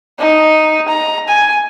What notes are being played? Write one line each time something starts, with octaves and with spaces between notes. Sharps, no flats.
D#4
A#5
G#5